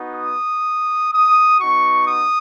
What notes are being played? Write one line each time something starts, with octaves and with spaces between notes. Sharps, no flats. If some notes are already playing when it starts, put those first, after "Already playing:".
Already playing: B3 D#4 F#4
D#6
D#6
B3 D#4 F#4 C#6
D#6